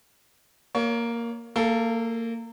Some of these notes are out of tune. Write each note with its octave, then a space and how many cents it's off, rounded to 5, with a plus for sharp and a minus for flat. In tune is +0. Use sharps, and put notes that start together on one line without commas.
A#3 +0 C#5 +30
A#3 -25 A4 +0